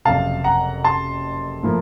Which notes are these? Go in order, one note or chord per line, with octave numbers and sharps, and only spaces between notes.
F#1 F2 C3 F5 A5
F#5 A#5
A5 C6
A2 F3 A#3